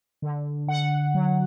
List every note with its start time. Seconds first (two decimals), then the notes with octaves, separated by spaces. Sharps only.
0.22 D3
0.67 D3 F#5
1.14 F#3